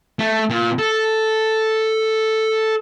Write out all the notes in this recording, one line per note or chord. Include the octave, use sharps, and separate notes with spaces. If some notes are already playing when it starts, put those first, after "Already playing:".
A3
A#2
A4